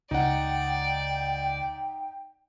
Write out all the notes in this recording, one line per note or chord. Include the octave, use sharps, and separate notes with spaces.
C#2 D#4 D5 F#5 G5